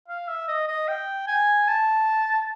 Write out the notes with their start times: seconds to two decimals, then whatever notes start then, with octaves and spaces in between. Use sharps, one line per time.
0.08 F5
0.28 E5
0.48 D#5
0.68 D#5
0.88 G5
1.28 G#5
1.68 A5